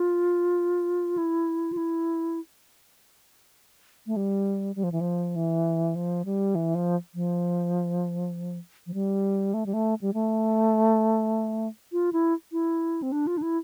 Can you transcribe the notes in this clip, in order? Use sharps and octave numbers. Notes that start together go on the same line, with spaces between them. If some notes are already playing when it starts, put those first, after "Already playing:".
Already playing: F4
E4
F4
E4
A3
G3
G3
F3
E3
F3
E3
F3
G3
E3
F3
F3
F3
G3
A3
G3
A3
G3
A3
F4
E4
E4
C4
D4
F4
D4
E4